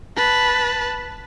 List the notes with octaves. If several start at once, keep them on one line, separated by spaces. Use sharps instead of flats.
B4 A5